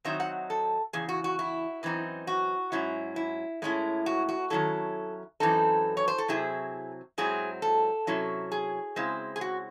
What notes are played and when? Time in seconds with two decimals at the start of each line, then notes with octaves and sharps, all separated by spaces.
0.05 D#3 F#3 C4 D#4 E5
0.20 F#5
0.50 A4
0.93 E2 C#3 G#4
1.09 F#4
1.24 F#4
1.39 E4
1.83 F#2 E3 C4 D#4
2.27 F#4
2.72 G#2 F#3 C#4 E4
3.16 E4
3.62 A2 G#3 C#4 E4
4.06 F#4
4.29 F#4
4.50 D#3 F#3 C#4 E4 A4
5.40 F#2 E3 C4 D#4 A4
5.97 C#5
6.08 C5
6.18 A4
6.28 C3 F#3 C4 E4 G#4
7.18 G#2 F#3 C4 E4 G#4
7.62 A4
8.07 C3 F#3 C#4 E4
8.52 G#4
8.96 C#3 G#3 C4 E4
9.36 G#4
9.41 F#4